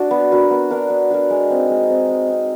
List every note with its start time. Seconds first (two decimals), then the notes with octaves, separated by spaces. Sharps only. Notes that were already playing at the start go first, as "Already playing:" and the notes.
Already playing: D4 F#4
0.11 B3
0.32 D4 F#4 A#4
0.51 B3
0.71 D4 F#4 A#4
0.90 B3
1.10 D4 F#4 A#4
1.30 G#3
1.50 C4 D#4
1.70 G#3
1.90 C4 D#4
2.09 G#3
2.29 C4 D#4